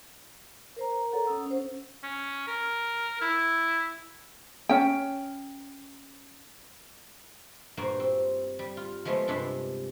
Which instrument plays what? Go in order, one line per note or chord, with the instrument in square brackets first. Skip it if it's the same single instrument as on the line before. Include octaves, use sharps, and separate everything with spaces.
[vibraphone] A#4 C5 A#5
A#4
A4 C#5 F#5 A#5
C#4 F#5 D#6 E6
C#4 C5
[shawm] C#4
A#4
E4
[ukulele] C#4 G5
[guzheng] G2 A#2 A#3 F#4 C5
C4
G3
F4
F3 G#3 A3 B3 F4
G2 C3 G#3 D4 B5 C6